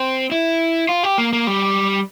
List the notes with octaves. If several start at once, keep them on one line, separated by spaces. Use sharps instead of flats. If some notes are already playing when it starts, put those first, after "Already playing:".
Already playing: C4
E4
F4
G4
A#3
A#3
G3